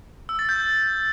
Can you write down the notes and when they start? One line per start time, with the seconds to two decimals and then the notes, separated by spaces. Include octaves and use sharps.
0.29 E6
0.39 A6
0.49 G6